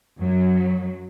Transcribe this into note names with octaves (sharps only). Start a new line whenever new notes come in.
F#2 F#3